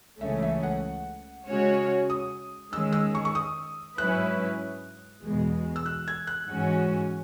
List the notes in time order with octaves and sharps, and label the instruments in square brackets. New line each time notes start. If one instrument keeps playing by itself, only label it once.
[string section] C#2 C#3 E3 A3 C#4 [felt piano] E5
[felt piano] E5
F#5
[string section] C#3 G#3 C#4 F#4 C#5
[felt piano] D#6
[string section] D#3 G#3 C#4 [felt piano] E6
[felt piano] E6
C#6
C#6
D#6
[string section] G#2 F#3 C#4 E4 B4 [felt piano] F#6
[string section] E2 B2 G#3
[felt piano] E6
F#6
G#6
F#6
[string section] G#2 E3 G#3 C#4 F#4